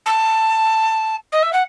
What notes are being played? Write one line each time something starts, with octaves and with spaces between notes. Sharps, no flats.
A5
D#5
E5
F#5